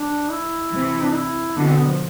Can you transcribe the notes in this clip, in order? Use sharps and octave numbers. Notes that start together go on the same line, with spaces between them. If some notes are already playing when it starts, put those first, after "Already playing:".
Already playing: D4
E4
C3 E3
D4
E4
B2 D3 D4
C4
B3
F3